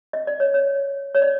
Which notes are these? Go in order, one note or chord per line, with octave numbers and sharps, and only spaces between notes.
D#5
D5
C#5
C#5
C#5
D5